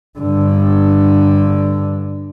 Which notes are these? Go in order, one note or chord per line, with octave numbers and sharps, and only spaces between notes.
G2 D3